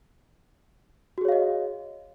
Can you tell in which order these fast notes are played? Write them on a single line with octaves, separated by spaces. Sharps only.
F#4 G#4 C#5 F5 D#5